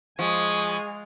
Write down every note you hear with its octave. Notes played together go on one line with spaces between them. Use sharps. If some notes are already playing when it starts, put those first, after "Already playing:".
F3 G#3 G#5 C#6 D#6